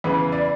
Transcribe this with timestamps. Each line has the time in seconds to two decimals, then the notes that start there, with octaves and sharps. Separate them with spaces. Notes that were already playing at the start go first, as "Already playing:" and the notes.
0.04 E2 C#3 E3 B4
0.32 D5